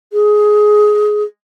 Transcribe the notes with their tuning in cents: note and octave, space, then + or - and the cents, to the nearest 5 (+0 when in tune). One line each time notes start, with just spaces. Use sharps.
G#4 +15